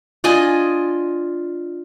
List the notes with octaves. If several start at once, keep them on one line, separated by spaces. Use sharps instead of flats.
D4 F4 D#5 G#5